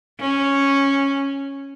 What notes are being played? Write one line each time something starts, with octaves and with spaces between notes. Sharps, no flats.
C#4